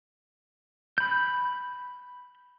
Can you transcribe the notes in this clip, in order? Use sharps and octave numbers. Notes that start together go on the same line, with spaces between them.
B5 G6